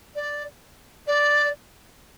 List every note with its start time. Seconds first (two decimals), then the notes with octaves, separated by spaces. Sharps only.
0.15 D5
1.06 D5